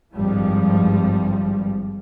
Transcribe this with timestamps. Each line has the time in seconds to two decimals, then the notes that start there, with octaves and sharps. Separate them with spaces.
0.15 G#1 G2 F3 G3